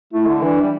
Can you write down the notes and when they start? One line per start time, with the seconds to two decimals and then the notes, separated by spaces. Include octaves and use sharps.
0.13 A3 E4
0.27 D3
0.41 E3 D4
0.62 G3